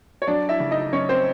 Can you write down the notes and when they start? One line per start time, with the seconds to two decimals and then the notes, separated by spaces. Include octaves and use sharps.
0.22 C#5
0.27 F#3 D4 D5
0.49 E4 E5
0.60 C#3
0.71 D#4 D#5
0.92 F#2 C#4 C#5
1.09 C4 C5